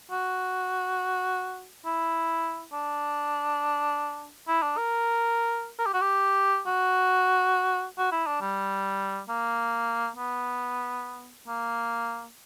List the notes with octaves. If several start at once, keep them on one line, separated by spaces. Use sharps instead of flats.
F#4
E4
D4
E4
D4
A#4
A#4
G4
F#4
G4
F#4
F#4
E4
D4
G3
A#3
B3
A#3